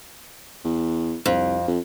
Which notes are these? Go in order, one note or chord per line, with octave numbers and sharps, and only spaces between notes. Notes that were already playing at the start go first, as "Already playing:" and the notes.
E2
C2 F2
F2